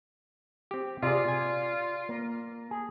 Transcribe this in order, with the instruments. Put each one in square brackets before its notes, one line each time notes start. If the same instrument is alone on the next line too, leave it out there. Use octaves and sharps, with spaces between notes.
[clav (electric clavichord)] C4 G4
[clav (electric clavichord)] C3 G#4 [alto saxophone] F4 [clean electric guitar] D5
[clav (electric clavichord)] G#5
[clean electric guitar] A#3
G#4